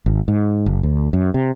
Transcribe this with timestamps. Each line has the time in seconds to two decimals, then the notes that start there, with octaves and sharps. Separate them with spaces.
0.06 G#1
0.28 G#2
0.66 F#1
0.83 D2
1.13 F#2
1.34 C3